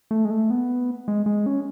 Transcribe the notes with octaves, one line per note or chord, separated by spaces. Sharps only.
A3
G#3
A3
B3
G#3
G#3
C#4